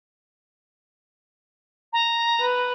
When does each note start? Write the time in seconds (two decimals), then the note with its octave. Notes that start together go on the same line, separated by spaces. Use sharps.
1.93 A#5
2.40 B4